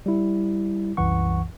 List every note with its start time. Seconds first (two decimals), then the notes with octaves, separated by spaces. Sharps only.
0.06 G3 E4
0.97 C2 F#2 E3 F#5 C#6